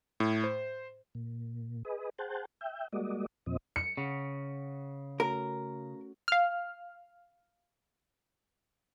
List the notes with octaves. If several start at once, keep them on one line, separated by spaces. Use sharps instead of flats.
A2
C5
A#2
G#4 B4 D#5
G#4 C5 F#5 G5 A5
E5 G5
G3 G#3 A#3 F#4 D5 D#5
E2 A#2 F3 C4 D#5
C#7
C#3 F#5
A3 C#4 F#4 A#4
F5 F6